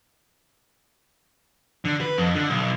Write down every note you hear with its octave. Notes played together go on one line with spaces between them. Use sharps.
D3
B4
F2
D3
B1